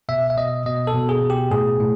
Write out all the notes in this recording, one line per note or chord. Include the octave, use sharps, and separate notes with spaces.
B2 E5
E5
B2 D#5
B2 D#5
A4
B2
G#4
B2
G4
A2 G#4
A2